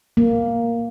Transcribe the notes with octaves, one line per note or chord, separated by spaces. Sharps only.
A#3